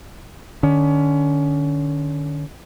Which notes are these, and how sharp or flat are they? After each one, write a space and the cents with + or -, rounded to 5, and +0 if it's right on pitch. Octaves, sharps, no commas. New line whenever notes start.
D3 +40 C#4 +30